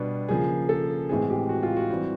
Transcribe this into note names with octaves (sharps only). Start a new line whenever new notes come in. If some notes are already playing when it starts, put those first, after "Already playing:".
Already playing: B2 G3 B3 D4
C#3 F3 A#3 G#4
A4
A2 E3 G#3 C4 G#4
G4
F#4
F4
F#4
E3 G3 C4